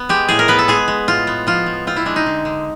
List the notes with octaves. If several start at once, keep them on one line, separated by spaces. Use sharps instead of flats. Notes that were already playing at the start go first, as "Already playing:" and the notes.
Already playing: B3
G#3 G4
A2 G#4
A#4
B3 B4
A4
G#3 G#4
G#3
A2 F4
B3
F3 F4
F3
C4 F4
E4
G#3 D4
D#4
D3
D3